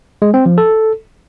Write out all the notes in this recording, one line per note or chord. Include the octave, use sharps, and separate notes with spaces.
G#3
C4
F3
A4